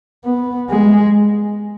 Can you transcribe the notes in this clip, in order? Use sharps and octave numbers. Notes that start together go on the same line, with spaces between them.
B3
G#3